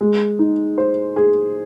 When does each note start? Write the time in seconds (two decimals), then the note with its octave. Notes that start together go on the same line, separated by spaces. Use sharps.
0.01 G#3
0.39 D#4
0.78 C5
1.16 G#4